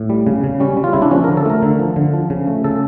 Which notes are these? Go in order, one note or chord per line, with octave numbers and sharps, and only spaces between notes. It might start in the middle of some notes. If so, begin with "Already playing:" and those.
Already playing: A2
G3
C#3
C#3
G3 C#4
G3
F4
C#3 E4
D4
F3 C#4
A#4
D3
A4
A3 A#4
D3
F3
D3
F3
C#3
A3
C#3 A4